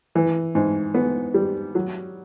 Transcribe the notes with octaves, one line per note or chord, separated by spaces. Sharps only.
E3
G#2
B3
G3
F#3